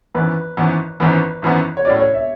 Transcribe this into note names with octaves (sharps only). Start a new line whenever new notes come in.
G#1 F#2 E3 B3 B4
G#1 F#2 E3 B3
G#1 F#2 E3 B3 B4
G#1 F#2 E3 B3
C#5
A2 F#3 C#4 D5
C#5
E5